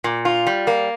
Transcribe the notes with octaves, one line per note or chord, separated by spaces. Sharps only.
A#2
F4
G3
A#3